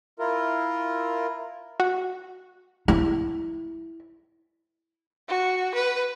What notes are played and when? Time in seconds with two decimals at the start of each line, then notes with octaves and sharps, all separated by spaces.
0.19 E4 F4 A#4
1.80 F#4
2.88 E4
5.29 F#4
5.75 B4